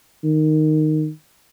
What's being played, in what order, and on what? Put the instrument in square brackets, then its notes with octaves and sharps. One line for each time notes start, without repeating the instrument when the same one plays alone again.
[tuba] D#3